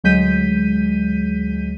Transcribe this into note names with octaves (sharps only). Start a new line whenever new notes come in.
D2 F#3 G#3 G6 B6 D#7